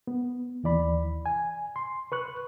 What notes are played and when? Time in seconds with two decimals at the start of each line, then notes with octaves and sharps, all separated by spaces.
0.07 B3
0.64 D#2 E3 D5 B5
1.26 G#5
1.76 C6
2.12 B4 C#6 F#6